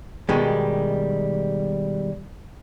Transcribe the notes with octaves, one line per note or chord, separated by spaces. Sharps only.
B2 D#3 G3 G#3